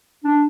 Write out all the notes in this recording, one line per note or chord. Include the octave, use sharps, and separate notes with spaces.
D4